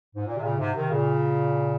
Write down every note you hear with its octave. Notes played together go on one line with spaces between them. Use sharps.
G#2
A#2
C3
A#2 C#3
G#2 C3
C3 D#3
A#2 C#3